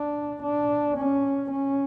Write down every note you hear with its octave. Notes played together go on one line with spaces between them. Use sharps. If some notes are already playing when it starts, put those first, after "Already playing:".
Already playing: D4
D4
C#4
C#4